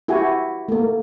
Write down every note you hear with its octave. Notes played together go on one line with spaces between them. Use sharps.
E4 F#4 G4 G#5
A3 A#3